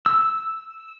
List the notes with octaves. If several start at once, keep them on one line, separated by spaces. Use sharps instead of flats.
E6